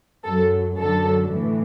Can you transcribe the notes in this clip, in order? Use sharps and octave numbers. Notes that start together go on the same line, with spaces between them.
F#2 F#3 A4
F#2 D3 F#3 A4
A2 E3